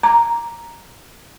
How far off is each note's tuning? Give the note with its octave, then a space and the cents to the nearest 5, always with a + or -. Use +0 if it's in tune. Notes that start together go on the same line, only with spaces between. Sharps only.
A#5 +0 D6 -5